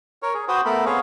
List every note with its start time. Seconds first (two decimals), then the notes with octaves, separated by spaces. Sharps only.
0.23 A#4 C#5
0.34 G#4
0.48 F#4 B4 C5 G5 D#6
0.65 A3 B3 A4 A#4 B5
0.86 B3 C4 G#4 C#5 F5